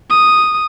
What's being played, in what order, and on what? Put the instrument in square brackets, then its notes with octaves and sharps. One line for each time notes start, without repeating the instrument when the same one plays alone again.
[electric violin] D#6